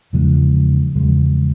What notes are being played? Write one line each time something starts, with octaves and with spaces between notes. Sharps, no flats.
E2 C#3 F3 G#3
E2 C#3 F3 G#3